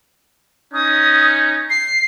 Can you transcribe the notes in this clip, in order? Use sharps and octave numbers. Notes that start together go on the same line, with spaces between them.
C#4 D#4 D#6
C7